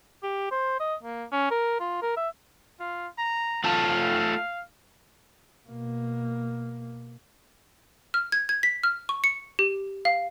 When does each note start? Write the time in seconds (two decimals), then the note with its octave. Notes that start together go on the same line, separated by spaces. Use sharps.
0.23 G4
0.51 C5
0.80 D#5
1.03 A#3
1.32 C#4
1.51 A#4
1.80 F4
2.02 A#4
2.17 E5
2.80 F4
3.18 A#5
3.64 A3 F4 F5 A5
5.68 B2 A#3
8.14 F6
8.32 G#6
8.49 G#6
8.63 B6
8.83 F6
9.09 C#6
9.24 C#7
9.59 G4
10.05 F5